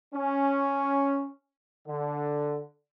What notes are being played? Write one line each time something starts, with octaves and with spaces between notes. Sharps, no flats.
C#4
D3